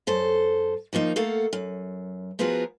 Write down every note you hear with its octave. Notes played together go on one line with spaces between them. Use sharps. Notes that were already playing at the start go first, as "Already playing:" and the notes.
F#2 A4 C5
D#3 F3 A#3 D#4
A3 A#3 A4 F5 F#5
F#2
F3 B3 F4 F#4 G#4 A#4